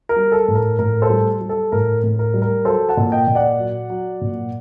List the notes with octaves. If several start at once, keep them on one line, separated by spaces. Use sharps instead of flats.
A#4
G3
A4
A2
A#4
A2 A#4
A4 C5
G3
G3
A4
A2 A#4
A2
A#4
G3
A#4
F#3 A4 C5
F#5 A5
A#2
D#5 G5
A#2
D5 F#5
F#3
F#3
A#2